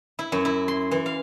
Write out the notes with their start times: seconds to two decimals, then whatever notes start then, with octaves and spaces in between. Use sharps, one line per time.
0.19 E4
0.32 F#2
0.45 E4
0.68 C6
0.91 E3
1.06 F5